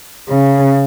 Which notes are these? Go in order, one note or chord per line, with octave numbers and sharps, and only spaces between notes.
C#3